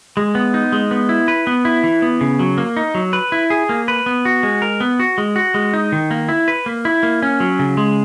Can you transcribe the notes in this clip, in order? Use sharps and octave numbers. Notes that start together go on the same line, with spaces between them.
G#3
B3
D#4
G#3
B3
E4
B4
B3
E4
E3
B3
C#3
F#3
A#3
D#4
F#3
B4
E4
G#4
A#3
B4
B3
F#4
G#3
A#4
B3
F#4
G#3
F#4
G#3
D#4
D#3
A#3
E4
B4
A#3
E4
A#3
C#4
F#3
C#3
G#3